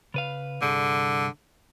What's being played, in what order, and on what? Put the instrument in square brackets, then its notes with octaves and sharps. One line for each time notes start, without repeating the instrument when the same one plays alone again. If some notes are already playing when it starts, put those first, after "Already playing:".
[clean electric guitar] C#3 B4 F5
[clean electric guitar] C2 G2 G#4 [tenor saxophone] D3